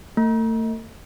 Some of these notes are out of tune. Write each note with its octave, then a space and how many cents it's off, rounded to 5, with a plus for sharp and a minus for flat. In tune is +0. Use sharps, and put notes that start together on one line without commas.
A3 +40